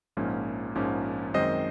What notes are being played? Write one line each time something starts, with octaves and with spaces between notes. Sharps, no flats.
A#1 G#2 F3 A#3 C#4
A#1 G#2 F3 A#3 C#4
F#2 D#3 G#3 C4 C5 D#5